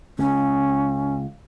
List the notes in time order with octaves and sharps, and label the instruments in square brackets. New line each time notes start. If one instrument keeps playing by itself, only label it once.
[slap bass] C#2 [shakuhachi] C#4